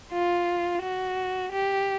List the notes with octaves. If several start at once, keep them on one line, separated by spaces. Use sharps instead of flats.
F4
F#4
G4